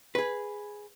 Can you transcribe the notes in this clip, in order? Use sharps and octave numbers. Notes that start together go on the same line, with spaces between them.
G#4 B4